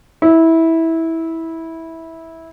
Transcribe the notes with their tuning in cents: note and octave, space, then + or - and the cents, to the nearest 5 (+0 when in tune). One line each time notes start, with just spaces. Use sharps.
E4 -15